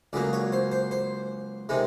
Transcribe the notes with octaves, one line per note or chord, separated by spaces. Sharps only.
C#2 C#3 F#3 A#3 D5
C#5
C5
C5
C5
C3 D#3 G#3